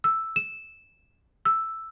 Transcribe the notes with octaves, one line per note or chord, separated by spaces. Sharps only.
E6
E7
E6